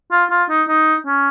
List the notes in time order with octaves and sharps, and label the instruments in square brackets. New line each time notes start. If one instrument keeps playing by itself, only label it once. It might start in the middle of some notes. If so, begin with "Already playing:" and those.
[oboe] F4
F4
D#4
D#4
C#4